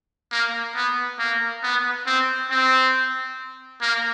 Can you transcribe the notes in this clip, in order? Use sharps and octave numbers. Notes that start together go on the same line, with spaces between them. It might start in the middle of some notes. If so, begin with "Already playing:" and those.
A#3
B3
A#3
B3
C4
C4
A#3